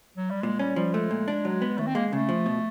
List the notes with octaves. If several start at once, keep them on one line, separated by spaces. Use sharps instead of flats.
F#3
G3
A#2 G#3
G3 C#4
F3 G3
G#3 A3
A#2
D4
F#3
B3
D#2 A3
C4
G#3 A#3
C#3 A3
F3
B2